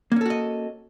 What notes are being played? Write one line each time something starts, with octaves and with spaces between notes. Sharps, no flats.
A#3 C#4 F#4 A4 D#5